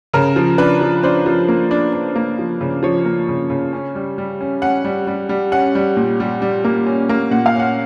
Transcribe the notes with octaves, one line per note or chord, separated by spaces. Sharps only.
C#3 A#4
F3
D4 B4
F3
D4 C5
F3
A#3
D4
D4
A#3
F3
C#3
F3 C#5
A#3
C#3
C#3
C#4
G3
G3
C#4
C#4 F#5
G3
G3
G3
C#4 F#5
G3
A#2
G3
G3
A#3
C#4
A#3
A#2 F#5
F5
C#4 F#5